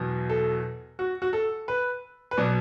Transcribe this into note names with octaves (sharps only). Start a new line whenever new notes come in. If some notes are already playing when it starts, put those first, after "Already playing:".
Already playing: E2 B2 F#3
A4
F#4
F#4
A4
B4
B4
B2 F#3 D5